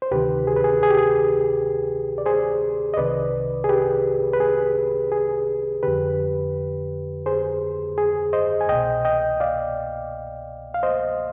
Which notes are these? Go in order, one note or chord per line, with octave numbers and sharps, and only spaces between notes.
C5
D2 C3 D#3 G4 B4
G#4
B4
G#4
G#4
G4
G#4
D5
G#4 C5
D#5
C2 C3 D#3 B4 D5
G#4
G4 B4
B4
G#4
G#4
F2 D3 G4 B4
G#4 C5
G#4
C5 D#5
G#5
C2 B2 D#5 G5
D#5 G5
D5 F5
F5
C5 D#5